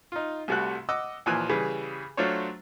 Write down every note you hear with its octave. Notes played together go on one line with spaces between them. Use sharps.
D#4 F4
C2 C3 G3 A3 F#4 F#6
D#5 F#5 D6 E6
D#2 A#2 E3 F3 G#5 F#6
C#3 E3 G3 G#4 B4
F#3 A3 D4 F4 C5 C#5